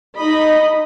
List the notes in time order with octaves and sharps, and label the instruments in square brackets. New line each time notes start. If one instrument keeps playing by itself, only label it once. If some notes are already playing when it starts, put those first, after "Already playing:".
[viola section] D#4 D#5 B5